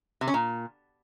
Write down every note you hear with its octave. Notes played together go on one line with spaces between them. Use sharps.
C3
C#4
A#2